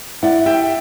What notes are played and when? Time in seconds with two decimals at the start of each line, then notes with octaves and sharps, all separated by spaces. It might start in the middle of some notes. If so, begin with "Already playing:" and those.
0.23 E4 D5 F#5
0.46 G4 E5 G5